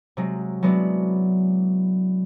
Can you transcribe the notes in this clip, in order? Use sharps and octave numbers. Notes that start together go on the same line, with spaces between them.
C3 F#3 G#3
F#3 G#3 B3 D4 E4